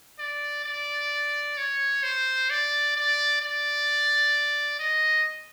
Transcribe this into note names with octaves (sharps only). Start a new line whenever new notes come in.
D5
D5
C#5
C5
D5
D5
D5
D#5